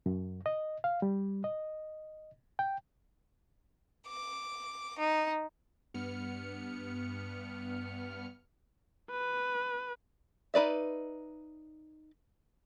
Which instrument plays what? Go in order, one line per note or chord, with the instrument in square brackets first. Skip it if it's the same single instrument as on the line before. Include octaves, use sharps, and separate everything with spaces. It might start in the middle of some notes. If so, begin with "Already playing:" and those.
[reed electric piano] F#2
D#5
F5
G3
D#5
G5
[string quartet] D6
D#4
[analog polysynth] G2 B3 F6 C#7
[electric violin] B4
[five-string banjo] D#4 B4 D5 E5